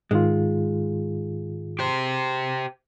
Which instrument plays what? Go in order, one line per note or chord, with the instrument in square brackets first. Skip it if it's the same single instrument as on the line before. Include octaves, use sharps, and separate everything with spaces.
[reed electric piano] G#2 D#3 F4 [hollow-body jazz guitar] G#3
[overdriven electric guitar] G4 C5